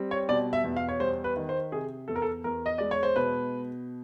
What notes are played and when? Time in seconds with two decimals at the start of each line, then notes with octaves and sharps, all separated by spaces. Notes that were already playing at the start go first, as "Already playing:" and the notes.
Already playing: G3 C4
0.11 C#5
0.29 B2 D5
0.53 E5
0.64 E2
0.76 F5
0.89 C#5
1.00 G3 C5
1.24 B4
1.37 D#3
1.49 C5
1.72 C3 G#4
2.08 E2 A4
2.16 A#4
2.22 A4
2.44 E2 A#4
2.66 D#5
2.78 G#3 D5
2.91 C#5
3.03 C5
3.16 B2 B4